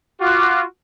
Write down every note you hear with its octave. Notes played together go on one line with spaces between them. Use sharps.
F4 F#4 D6 F#6